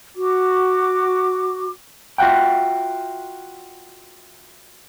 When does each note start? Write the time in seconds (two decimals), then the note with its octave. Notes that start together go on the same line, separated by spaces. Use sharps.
0.16 F#4 D6
2.18 F4 F#4 E5 F#5 G5